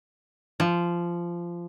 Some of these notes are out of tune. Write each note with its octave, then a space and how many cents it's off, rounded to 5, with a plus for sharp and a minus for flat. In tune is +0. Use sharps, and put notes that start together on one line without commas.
F3 -15